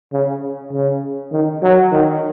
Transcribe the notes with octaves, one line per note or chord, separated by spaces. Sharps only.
C#3
C#3
D#3
F#3
D#3